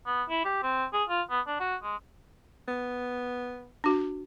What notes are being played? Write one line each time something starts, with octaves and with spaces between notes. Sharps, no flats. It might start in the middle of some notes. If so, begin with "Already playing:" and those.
B3
E4
G4
C4
G#4
F4
B3
D4
F#4
G#3
B3
D4 F#4